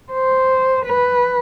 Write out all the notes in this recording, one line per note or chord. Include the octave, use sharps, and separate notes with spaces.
C5
B4